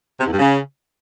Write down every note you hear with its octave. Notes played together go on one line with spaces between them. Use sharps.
C3
E2
G2
C#3